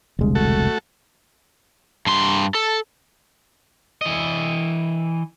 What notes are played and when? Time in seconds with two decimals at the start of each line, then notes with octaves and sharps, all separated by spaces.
0.19 E1 C2 D3 G#3
0.35 A3 F#4 A4
2.06 G2 C6
2.55 A4
4.01 E3 D#5